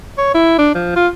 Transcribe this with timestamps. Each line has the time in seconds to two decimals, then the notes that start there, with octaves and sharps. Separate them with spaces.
0.18 C#5
0.35 E4
0.58 D4
0.75 F3
0.96 F4